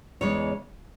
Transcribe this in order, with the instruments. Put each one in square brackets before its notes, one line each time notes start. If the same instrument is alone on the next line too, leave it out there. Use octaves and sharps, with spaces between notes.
[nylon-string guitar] E2 C#3 G#3 C#5